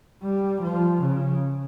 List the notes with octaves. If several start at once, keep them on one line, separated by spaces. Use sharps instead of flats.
G3
F3
C#3